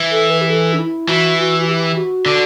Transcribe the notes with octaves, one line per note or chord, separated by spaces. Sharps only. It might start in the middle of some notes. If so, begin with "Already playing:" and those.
Already playing: E3
A4
B4
G4
A4
D4
E4
E3 F#4
F#4
F#4
G4
F#4
D3